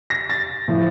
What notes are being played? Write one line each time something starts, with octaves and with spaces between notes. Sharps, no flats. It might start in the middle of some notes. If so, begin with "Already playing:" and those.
A#6
A6
A2 F3